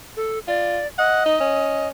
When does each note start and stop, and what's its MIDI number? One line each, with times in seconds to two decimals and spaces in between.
0.17 0.39 69
0.48 0.80 65
0.48 0.87 74
0.99 1.88 75
0.99 1.25 78
1.26 1.36 63
1.40 1.90 61